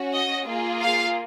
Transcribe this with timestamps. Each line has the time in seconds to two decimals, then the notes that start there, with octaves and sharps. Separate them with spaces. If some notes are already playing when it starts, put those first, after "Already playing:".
Already playing: C#4 F#4
0.15 D#5
0.48 A#3 F4 G#4
0.82 F5